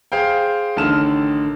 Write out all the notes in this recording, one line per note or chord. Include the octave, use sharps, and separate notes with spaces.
G#4 C5 F5 G5
A1 D3 D#3 A4 F6 E7